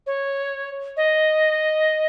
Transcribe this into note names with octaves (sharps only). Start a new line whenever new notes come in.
C#5
D#5